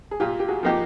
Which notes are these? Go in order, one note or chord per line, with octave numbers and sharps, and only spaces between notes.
G#4
A#2 F4 G4
G4
F#4 G#4
F3 A#3 D#4 G4